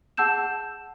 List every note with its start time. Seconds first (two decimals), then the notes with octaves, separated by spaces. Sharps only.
0.17 G#4 F#5 A5 E6 G6 E7